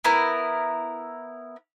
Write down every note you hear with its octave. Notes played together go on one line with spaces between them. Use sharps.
B3 E4 A#4